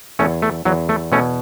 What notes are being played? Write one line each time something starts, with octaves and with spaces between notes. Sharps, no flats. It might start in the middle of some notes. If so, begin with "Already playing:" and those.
E2 A3 C#4
A3
E2 F#3
A3
B2 A3 C#4